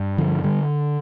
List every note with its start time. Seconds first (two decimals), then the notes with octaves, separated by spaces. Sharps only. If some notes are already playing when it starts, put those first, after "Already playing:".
Already playing: G2
0.18 D3 F3
0.43 D3 G3